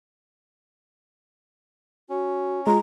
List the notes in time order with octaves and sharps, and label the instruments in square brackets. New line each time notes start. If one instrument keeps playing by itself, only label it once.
[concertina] C#4 [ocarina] F#4
[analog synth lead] G#3 [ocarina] F4 [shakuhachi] A#5